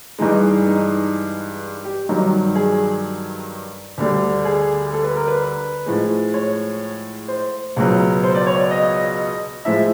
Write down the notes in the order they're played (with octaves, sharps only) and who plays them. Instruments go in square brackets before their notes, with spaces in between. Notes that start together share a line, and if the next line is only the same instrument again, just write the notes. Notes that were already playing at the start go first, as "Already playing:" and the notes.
[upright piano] G2 E3 G#3 D#4
D#4
G4
G2 D#3 F#3
G#4
D2 D3 G3
G#4
A4
B4
A#4
B4
A2 F3 G#3
C#5
C5
C#2 B2 F#3
C5
D5
C#5
D5
D#5
A2 F3 G#3 E5